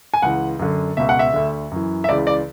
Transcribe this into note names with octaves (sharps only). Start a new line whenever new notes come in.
G#5
C#2 C#3 E3 F#5
F#2 D3
C#2 B2 E5
F#5
E5
D2 D3
F#2 E3
E5
C#2 C#3 E3 D5
D5